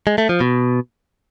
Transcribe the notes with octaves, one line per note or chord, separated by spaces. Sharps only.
G#3
A3
F3
B2